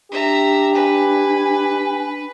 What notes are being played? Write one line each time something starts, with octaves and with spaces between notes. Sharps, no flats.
D4 G4 E5 A#5
B4 G#5